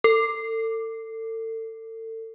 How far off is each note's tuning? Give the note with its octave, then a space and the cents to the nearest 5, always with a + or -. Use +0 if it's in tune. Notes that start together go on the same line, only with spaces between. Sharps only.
A4 +35